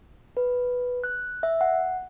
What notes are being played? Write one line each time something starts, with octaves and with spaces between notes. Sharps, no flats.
B4
F#6
E5
F#5